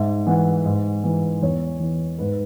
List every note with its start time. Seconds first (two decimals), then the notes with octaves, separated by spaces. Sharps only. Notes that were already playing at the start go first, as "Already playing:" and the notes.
Already playing: G#2 E5
0.27 E3 F#5
0.65 G#2
1.04 E3
1.42 E2 C#5
1.80 E3
2.19 G#2 B4